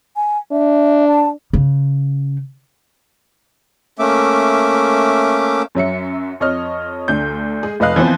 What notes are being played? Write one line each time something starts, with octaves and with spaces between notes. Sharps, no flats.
G#5
D4 E5
A5
C#3
A3 A#3 C#4 E5 D6
F#2 F#3 E5 C#7
F2 C#5 D#5 F6
D2 D3 G6
G#3 G#4
F1 B4 D#5 F5 F#6
E3 F3 B3 C4 C5